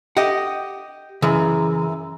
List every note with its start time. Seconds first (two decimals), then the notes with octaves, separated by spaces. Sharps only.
0.17 G4 D#5 F#5
1.22 F#2 C#3 E3